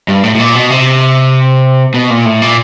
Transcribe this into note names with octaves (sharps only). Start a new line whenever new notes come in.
G2
A2
A2
A#2
B2
C3
B2
A#2
A2
A#2